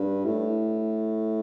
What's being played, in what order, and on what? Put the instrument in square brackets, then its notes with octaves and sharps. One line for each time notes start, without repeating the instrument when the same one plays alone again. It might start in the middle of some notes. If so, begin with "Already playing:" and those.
Already playing: [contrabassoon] G2
A2